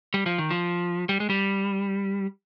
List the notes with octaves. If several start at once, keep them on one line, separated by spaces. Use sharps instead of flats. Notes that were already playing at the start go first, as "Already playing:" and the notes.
G3
F3
D#3
F3
G3
G#3
G3